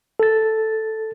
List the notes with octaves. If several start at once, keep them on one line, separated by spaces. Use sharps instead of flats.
A4 A6